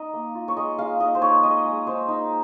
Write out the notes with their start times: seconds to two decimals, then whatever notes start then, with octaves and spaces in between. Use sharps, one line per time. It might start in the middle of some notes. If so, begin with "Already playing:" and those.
Already playing: D#4 D#5
0.14 A#3
0.35 F4
0.48 C#5
0.57 G#3 D#5
0.78 G#3 F5
1.00 D#4 D#5
1.15 C5
1.21 D#4 C#5
1.43 G#3 D#5
1.65 G#3
1.87 D#4 C5
2.08 D#4